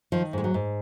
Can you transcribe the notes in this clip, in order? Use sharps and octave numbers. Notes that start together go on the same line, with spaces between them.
D#3 F3
G#2 G#3
F#3
G#2